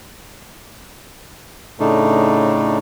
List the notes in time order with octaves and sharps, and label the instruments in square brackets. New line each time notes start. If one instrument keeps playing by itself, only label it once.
[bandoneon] A2 C#3 A3 D4 D#4